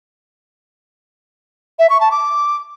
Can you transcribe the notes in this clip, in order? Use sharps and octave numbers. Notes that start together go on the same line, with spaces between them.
E5
C#6
A5
D6